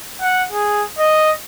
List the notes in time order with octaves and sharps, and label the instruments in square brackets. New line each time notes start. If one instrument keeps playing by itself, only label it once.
[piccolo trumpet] F#5
G#4
D#5